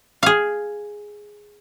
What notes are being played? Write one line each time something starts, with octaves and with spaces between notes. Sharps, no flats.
G#4 F5